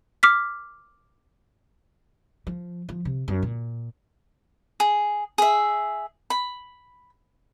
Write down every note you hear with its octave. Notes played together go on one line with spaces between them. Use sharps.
D6 F6 B6
F3
F3
C3
F#2
A#2
G#4
G#4 E5
B5